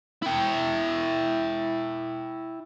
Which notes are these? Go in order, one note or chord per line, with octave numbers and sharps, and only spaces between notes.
E4 G5